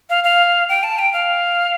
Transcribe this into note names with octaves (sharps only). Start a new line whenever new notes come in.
F5
F5
G5
A5
G5
F5